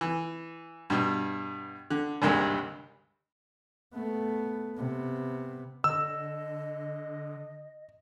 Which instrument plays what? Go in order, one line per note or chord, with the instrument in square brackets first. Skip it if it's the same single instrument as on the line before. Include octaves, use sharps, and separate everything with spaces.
[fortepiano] E3
G2 B2
D3
G#1 D2 G2 C3 G#3 A#3
[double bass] A3 B3
C3 B3
[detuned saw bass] D3 [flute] D#5 [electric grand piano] E6